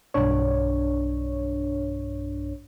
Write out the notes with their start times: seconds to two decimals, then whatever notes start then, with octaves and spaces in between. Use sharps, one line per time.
0.14 B1 G2 D4 C#5